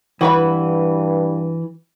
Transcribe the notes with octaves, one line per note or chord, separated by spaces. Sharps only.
G2 E3 F#4 B4 B5